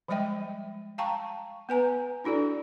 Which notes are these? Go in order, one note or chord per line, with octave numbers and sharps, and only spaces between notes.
F3 G3 G#3 D#5 E5 G5
F5 G5 A5 A#5 C#6
B3 B4 G#5 A#5
D4 E4 F#4 A4 D5